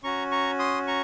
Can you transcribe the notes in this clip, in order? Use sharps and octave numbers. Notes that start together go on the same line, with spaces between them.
C#4 F#4 A#5 C#6
A#5 C#6
C6 D#6
A#5 C#6